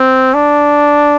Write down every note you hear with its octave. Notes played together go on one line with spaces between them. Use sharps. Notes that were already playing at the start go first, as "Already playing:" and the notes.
Already playing: C4
D4